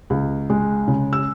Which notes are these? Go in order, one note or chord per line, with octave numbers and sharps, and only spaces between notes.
C#2
G#3
C#3
E6